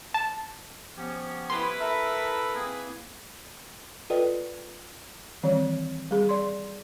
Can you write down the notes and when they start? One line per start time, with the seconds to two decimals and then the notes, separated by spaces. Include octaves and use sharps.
0.14 A5
0.97 F3 B3 C#4 G4
1.50 E4 B4 C6
1.80 A4 A#4 E5
2.55 A#3 C4 G#4
4.10 F4 A4 B4 D5 D#5 G5
5.43 D#3 E3 G3 C4 C#5
6.11 G3 G#4
6.29 D5 C6